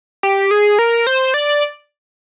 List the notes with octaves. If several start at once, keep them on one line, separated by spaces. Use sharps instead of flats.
G4
G#4
A#4
C5
D5